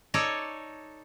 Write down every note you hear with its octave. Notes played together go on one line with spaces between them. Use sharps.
D#4 A4 C#5 D5